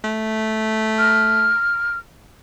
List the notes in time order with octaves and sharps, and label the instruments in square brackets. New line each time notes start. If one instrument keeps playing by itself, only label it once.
[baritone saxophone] A3
[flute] F6